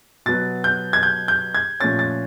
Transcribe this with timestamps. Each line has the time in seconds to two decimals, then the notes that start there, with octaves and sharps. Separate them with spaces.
0.26 B2 F#3 B3 A6
0.64 G6
0.93 G#6
1.03 G6
1.28 G6
1.55 G#6
1.80 A#2 F3 A3 C#4 A6
1.99 A6